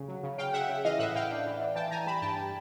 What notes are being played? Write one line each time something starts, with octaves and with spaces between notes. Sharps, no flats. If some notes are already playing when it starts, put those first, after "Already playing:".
Already playing: C#3
F#3
C#3
C#3 F5 G5
C#3 E5 F#5
C#3
E3 D#5 F5
A2 E5 F#5
A2 F5 G5
D4
E3
D4
E3 G5 A5
E3 G#5 A#5
G3 A5 B5
G2 G5 A5
G3